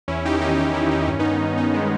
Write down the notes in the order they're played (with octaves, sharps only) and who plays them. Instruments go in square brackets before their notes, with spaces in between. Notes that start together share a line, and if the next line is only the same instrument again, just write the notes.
[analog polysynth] E2 C#4 E4
D#4 G4
D#3
D#4 G4
E2 D#4 G4
C#4 E4
D#3
D#4
G2 C#4
B3 D#4
D#3
G2 B3 D#4
G#3 B3
D#3